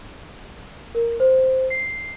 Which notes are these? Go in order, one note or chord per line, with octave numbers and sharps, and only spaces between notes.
A#4
C5
C7